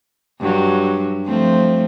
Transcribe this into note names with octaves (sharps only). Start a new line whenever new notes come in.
G2 F#3
F3 A3 C4